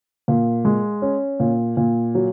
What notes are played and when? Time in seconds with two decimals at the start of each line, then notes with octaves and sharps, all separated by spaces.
0.28 A#2
0.65 G#3
1.02 C#4
1.40 A#2
1.77 A#2
2.15 F#3